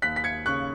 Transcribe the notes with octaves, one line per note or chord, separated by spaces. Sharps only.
D#2 F#6 B6
B6
G#6 C#7
C#3 C#6 F#6